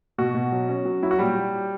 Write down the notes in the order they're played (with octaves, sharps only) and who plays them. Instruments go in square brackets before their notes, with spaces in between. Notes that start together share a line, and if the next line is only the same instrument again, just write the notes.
[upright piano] B2 [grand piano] F#4
[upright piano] B2
F#3
C#4
F#3
[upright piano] F#3 [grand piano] E4
[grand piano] F#4
[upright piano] A#2 [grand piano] G3 G4